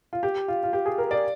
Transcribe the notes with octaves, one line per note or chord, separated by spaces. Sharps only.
F4
G4
F4
F4
G4
G#4
A#4
D5